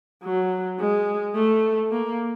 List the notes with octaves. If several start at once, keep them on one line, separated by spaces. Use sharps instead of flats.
F#3
G#3
A3
A#3